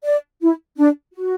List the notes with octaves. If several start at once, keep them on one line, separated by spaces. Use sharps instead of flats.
D5
E4
D4
F#4